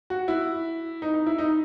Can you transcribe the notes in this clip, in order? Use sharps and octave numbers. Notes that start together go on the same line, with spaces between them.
F#4
E4
D#4
D#4
E4
D#4